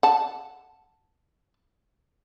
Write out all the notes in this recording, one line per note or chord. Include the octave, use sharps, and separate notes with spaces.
F#5 A5